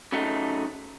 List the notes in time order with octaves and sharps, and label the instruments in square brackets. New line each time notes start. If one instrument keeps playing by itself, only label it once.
[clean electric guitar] C#3 F#3 A3 D#4